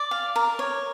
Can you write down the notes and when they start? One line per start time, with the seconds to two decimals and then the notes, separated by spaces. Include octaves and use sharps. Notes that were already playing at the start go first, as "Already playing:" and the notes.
Already playing: D5
0.11 F5
0.36 A#4
0.59 C#5